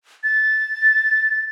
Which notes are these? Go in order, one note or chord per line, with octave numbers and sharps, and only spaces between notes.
A6